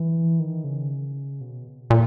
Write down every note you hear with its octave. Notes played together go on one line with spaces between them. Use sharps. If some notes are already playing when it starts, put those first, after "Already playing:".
Already playing: E3
D#3
C#3
B2
A#2